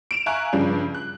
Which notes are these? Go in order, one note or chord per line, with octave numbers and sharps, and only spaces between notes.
D7 E7 F7
E5 F5 G#5 A#5 C#6 F#6
G2 C#3 F3 G3 C#4
F#6